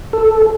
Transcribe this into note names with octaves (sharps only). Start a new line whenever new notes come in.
A4